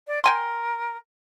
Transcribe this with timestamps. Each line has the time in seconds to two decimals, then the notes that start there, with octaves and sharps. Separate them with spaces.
0.07 D5
0.24 A#4 G5 G#5 C6